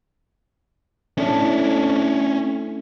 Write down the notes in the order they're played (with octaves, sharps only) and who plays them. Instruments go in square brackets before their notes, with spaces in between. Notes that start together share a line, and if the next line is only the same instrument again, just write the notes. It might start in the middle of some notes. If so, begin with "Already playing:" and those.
[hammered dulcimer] A2 [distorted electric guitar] C#4 D4